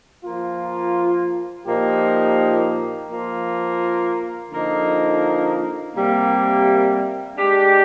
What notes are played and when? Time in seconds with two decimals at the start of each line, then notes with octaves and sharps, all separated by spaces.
0.24 F3 A#3 F4
1.66 A#2 F3 A#3 D#4 G4
3.09 F3 A#3 F4
4.51 D3 F3 A#3 D#4
5.94 C3 G3 A#3
7.37 G#3 D4 G4